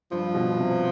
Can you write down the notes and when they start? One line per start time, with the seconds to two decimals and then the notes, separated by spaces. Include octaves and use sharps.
0.11 G2 F3
0.34 B2
0.57 C3